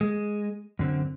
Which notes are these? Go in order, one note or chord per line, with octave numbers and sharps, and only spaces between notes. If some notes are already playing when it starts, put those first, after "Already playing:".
G#3
F#2 D3 C4